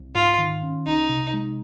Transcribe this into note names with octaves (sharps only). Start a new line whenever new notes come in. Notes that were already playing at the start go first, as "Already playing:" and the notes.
Already playing: C2
G#2 F4
D#3
C#4
C2 D#4
C3
G#3